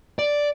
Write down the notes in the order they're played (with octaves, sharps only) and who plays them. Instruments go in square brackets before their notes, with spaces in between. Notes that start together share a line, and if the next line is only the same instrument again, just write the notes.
[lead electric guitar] D5